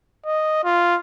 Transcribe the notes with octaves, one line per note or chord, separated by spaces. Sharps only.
D#5
F4